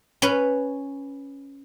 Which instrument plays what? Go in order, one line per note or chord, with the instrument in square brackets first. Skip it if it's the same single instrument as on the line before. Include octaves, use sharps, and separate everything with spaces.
[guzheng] C#4 B4